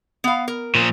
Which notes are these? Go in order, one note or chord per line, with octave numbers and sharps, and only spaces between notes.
B3 F5
A#4
A#2 F3